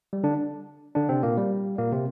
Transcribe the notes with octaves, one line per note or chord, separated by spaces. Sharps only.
G3
D3 D4
D3 D4
C3 C4
A#2 A#3
G3
A#2 A#3
C3 C4